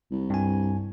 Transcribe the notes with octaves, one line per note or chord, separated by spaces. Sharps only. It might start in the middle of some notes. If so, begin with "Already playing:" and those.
C2
G2 G#5